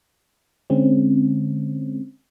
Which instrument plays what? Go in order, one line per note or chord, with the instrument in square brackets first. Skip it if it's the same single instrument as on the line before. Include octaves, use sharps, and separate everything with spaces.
[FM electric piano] D3 G#3 C4 C#4